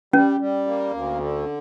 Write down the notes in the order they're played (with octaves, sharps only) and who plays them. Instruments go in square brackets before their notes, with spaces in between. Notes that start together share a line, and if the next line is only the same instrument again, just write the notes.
[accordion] G3 [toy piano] C#4
[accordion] G3
A#3
D2
D3